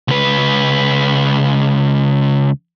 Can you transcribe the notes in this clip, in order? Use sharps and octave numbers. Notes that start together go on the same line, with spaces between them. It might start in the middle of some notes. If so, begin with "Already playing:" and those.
C#2 B4